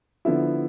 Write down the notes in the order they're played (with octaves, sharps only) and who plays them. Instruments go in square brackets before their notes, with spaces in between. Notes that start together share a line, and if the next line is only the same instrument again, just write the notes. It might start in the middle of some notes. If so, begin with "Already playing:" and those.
[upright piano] D3 F3 B3 E4